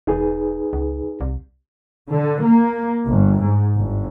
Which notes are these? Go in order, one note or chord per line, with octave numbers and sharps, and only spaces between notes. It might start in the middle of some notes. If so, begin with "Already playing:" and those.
E1 D#4 G#4 B4
C#2
C2
D3
A#3
G1
G#2
G1